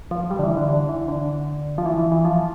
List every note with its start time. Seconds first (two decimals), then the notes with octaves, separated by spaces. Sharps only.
0.11 F3
0.31 G3
0.39 D3
0.44 E3
0.57 D3
0.69 D3
0.89 E3
1.08 D3
1.78 F3
1.86 E3
1.99 E3
2.12 E3
2.24 F3